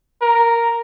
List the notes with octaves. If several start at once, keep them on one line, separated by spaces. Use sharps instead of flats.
A#4